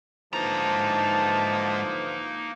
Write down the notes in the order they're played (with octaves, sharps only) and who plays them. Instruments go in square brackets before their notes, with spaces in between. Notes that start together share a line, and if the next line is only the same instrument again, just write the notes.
[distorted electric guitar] G#2 A#5 [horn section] D3 E3 F3 [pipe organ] A#3 D#4 [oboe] A5